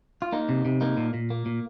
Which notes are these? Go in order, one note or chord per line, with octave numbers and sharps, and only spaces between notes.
F4
A#3 D#4
C3
C3
A#3 D#4
A#2
A#2
A#3
A#2